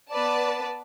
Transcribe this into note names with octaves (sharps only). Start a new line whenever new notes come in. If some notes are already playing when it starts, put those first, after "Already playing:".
B3 B4 D5 A5